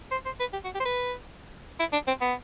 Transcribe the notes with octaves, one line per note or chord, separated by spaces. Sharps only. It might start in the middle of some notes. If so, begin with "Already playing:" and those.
C5
C5
B4
G4
F#4
G4
C5
B4
E4
D4
C4
B3